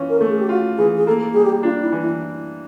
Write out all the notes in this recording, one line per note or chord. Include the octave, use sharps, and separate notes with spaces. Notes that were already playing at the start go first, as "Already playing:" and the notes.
Already playing: E3 C#4 F4
A#4
A3 A4
G#4
G4
F4 F#4
E3 G#4
G#4
A#3 A4
G3 G#4
G4
D4 F4
E4
E3
E4